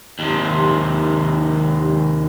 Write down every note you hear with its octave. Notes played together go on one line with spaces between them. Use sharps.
D#2 C3